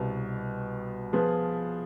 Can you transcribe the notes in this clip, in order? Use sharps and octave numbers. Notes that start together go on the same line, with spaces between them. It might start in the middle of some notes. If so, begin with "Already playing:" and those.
Already playing: C2 B2 B3
F3 B3 F4 G#4 B4